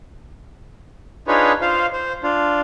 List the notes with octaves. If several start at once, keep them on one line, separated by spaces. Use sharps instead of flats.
D4 D#4 F4 G#4 B4 C#5
F4 C5 F5
C5
D4 F4